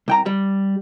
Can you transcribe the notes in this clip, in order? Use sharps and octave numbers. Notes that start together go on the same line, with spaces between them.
C2 G5 A#5
G3